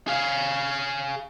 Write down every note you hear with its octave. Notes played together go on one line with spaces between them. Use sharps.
G#4 F5